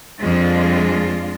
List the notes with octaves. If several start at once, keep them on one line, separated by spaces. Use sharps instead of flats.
F2 G#3 D4 F4